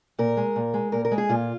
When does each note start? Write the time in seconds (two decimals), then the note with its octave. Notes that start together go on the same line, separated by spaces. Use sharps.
0.19 A#2 A#4
0.37 G#3
0.56 A#2
0.74 G#3
0.92 A#2 A#4
1.05 A#4
1.11 G#3
1.18 G#4
1.29 A#2 F4